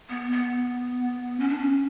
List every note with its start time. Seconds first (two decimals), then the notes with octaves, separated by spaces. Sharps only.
0.10 B3
0.32 B3
1.40 C#4
1.49 D4
1.58 C#4